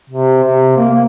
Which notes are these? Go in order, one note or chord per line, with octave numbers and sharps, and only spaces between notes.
C3
C3
A#3
A#3